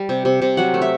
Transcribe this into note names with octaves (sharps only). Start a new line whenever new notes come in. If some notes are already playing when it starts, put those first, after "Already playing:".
Already playing: G3
C3
C3
C3
F#3 F#5
A3
E5